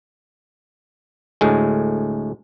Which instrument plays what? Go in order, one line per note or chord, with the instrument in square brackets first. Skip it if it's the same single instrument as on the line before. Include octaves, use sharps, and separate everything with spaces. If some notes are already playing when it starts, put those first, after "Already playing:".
[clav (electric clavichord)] D2 A2 G#3